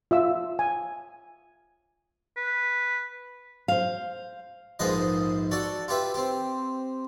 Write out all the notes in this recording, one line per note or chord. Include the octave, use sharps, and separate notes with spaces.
F4 E5 E6
G#5
B4
C5 F5
A#1 G#2 F3 G#4 B4 D#5
F#4 A4 D5
F4 G4 B4 E5
C4 G4